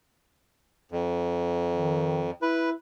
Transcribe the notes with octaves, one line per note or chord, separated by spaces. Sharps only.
F2
D#3
E4 B4